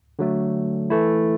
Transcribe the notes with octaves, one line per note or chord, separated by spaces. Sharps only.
D3 F#3 A3
E3 A3 E4